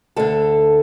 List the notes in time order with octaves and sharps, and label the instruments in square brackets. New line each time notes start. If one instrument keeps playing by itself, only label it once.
[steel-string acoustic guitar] D2 D3 A4